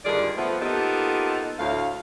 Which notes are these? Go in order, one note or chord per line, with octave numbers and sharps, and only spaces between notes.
G2 D3 D#3 F4 G#4 D5
F3 A3 B3
A#3 B3 D#4 F4 G4 A4
D2 A2 F5